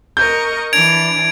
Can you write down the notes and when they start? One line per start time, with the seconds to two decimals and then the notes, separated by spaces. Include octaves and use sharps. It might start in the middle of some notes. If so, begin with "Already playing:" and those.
0.17 A#4 D#5 C#6 G6
0.73 E3 D4 G#6 D7 F7